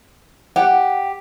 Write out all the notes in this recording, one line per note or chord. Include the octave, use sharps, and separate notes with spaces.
G4 F#5